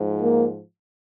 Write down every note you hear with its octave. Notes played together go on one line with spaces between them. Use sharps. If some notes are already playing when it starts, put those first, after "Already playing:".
Already playing: G#2 F3
A#3